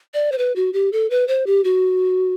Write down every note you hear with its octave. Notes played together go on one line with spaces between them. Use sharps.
D5
C5
B4
F#4
G4
A4
B4
C5
G4
F#4